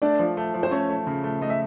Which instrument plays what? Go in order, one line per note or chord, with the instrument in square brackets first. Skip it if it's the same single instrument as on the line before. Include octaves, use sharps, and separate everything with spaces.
[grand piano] A3 [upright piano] D4 D5
[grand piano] F3
A3
F3
[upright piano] C5
[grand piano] A3 [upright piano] C#4 C#5
[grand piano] A3
C#3
A3
[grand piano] A3 [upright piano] D#5
[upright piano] E5